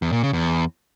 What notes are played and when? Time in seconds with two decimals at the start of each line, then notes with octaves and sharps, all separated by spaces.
0.02 E2
0.12 A#2
0.23 C#3
0.33 E2